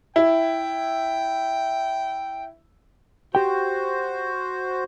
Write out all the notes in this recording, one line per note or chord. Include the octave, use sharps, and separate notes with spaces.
E4 G5
F#4 G4 C5 G5